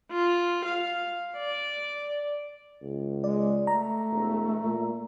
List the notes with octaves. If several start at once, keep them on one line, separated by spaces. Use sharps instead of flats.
F4
F5
D5
C#2
G#3 D5
A3 A#5
E1
A#2